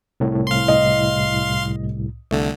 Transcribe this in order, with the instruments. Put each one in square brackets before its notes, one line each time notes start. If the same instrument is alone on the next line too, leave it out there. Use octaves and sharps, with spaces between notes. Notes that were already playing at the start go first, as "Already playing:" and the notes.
[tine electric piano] C2 A2
[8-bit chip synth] F5 C6
[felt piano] D#5
[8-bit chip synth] C2 D3 [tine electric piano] A3